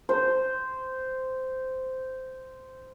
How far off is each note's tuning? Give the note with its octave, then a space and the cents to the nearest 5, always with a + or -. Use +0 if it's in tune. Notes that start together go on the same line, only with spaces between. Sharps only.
C5 -10